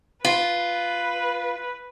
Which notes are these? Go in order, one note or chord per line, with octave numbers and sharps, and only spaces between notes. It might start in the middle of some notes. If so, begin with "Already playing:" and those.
F4 B4